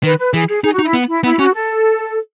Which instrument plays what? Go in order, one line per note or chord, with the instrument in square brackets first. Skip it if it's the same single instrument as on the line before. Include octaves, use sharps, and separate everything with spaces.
[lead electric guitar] D#3 [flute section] B4
[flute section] B4
[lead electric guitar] E3 [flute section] G#4
[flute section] G#4
[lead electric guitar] D#4 [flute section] G#4
[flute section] F#4
[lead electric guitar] D#4
[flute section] E4
[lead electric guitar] B3
[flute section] E4
[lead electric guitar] B3 [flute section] E4
[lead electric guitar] C#4 [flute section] F#4
[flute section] A4